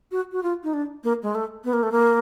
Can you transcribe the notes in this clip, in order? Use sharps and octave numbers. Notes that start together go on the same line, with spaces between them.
F#4
F#4
F4
D#4
D4
A#3
G#3
A3
B3
A#3
A3
A#3